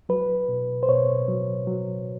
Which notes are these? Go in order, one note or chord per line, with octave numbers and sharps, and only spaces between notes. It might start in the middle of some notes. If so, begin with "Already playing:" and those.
F#3 B4
B2
C5
B2 C#5
F#3
F#3